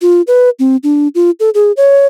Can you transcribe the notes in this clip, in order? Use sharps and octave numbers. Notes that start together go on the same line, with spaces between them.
F4
B4
C4
D4
F4
A4
G#4
C#5